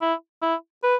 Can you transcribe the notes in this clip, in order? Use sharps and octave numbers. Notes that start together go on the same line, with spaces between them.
E4
E4
B4